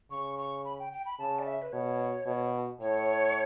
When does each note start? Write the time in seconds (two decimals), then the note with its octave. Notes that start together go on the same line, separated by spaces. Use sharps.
0.11 C#3 C#6
0.38 C#6
0.65 B5
0.79 G5
0.93 G5
1.06 B5
1.19 C#3 A5
1.39 D5
1.46 E5
1.62 B4
1.73 B2 C#5
2.27 B2
2.80 A2 C#5